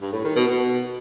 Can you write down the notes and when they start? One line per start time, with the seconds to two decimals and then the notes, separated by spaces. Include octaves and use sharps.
0.01 G2
0.13 A2
0.24 D#3
0.36 B2
0.47 B2